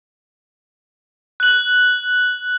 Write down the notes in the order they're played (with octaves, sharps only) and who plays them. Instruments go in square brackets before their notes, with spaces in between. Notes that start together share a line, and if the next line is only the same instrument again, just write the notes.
[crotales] F#6 F#7